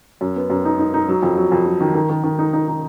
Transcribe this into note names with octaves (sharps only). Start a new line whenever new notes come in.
F#2
B3
F#2
D#4
D#4
D#4
F#3
F2
F#3
F2
F#3
D#3
D#3
D#3
D#3
D#4
D#4
D#4